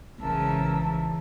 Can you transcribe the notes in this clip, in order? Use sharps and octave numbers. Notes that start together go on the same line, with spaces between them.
A#1 G#2 C#3 E3 A#4 A5 E6